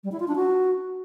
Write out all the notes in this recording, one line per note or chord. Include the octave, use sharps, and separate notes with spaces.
G3
E4
F4
D4
F#4